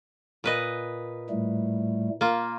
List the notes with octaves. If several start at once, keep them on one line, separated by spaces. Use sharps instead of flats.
A#2 B4 D#5
A2 G3 A3
A#3 F4